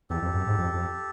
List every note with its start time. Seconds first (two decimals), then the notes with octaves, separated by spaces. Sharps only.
0.10 E2 G4 A4
0.22 F2
0.34 F#2
0.47 G#2
0.58 F2
0.74 F2